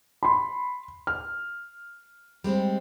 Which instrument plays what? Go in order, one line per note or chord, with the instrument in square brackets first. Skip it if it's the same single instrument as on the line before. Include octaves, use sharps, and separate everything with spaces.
[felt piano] B5 C6
F6
[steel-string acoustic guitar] G3 G#3 C4